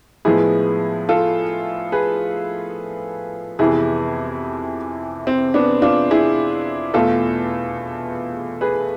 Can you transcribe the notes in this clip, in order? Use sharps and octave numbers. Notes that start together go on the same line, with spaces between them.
A2 F3 G#3 B3 E4 G#4
F4 A4
G#4 B4
F2 C3 E3 B3 E4 G#4
C4
B3 D4
D4 F4
E4 G#4
E2 B2 A3 F4 A4
G#4 B4